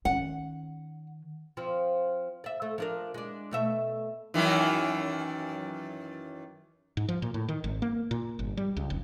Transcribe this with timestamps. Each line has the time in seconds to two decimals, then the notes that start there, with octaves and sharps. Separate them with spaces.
0.05 D#3 C#4 F#5
1.57 F3 C4
2.44 D5 E5
2.62 A3
2.78 F3 D4 A#4
3.14 G#3 D4
3.51 B2 A3 E5
4.34 F#2 D#3 E3
6.97 G#2
7.09 F3
7.22 A#2
7.34 A2
7.49 D#3
7.64 G#1
7.82 A#3
8.11 A#2
8.39 G1
8.57 G3
8.77 C#2
8.90 F1